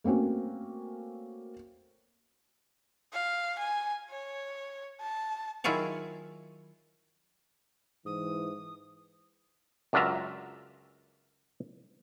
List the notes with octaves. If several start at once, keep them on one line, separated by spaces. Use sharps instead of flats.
A3 A#3 C4 C#4 F#4
F5
G#5
C#5
A5
D#3 F#3 E4 F4 G#4 C#5
G#2 E3 D#6
C#2 F#2 D4 F4 E5 A#5